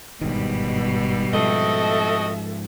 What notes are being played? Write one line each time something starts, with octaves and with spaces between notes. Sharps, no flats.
G1 G#2 B2 D#3 G3
G#2 F3 C4 F#4 A4 D#5 E5